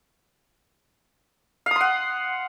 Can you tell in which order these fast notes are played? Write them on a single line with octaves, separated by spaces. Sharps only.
F5 D#6 C6 F#5